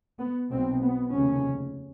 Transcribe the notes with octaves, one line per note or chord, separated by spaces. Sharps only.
B3
B1 B2 C4
B3
F1 D#2 C#3 C#4